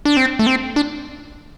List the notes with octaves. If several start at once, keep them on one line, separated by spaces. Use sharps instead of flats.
D4
C4
A3
C4
D4